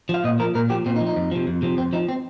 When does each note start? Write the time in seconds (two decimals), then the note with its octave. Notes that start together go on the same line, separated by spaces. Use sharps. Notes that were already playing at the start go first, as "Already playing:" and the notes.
0.09 F3 F5
0.24 A#2 D#5
0.39 F3 A#4
0.55 A#2 A#4
0.70 F3 G4
0.86 A#2 C4
0.96 D#4
1.01 F3
1.07 D#4
1.16 F2
1.31 C3 F3
1.47 F2
1.62 C3 F3
1.77 F2 C4
1.93 F3 D#4
2.09 C4